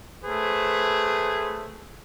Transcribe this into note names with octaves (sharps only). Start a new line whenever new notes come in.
A3 G#4 B4 C5